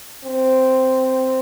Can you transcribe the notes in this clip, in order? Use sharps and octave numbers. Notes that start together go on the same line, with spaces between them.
C4